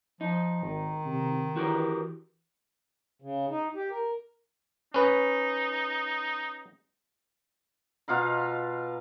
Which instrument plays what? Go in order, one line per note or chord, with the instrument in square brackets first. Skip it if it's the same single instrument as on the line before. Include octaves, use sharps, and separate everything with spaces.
[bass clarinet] F3 [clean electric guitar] D#4
[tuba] G#1 [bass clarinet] D#3
[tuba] C3
[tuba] E3 [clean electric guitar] F#4 G4 A#4
[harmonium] C#3
D#4
G4
A#4
[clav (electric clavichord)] C#4 B4 [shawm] D#4
[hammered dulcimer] B2 F4 F5 A#5